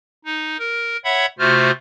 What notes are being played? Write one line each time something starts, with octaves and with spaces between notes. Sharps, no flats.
D#4
A#4
C#5 E5 F#5 B5 G#6
C3 A3 F4 F#4 C5 F6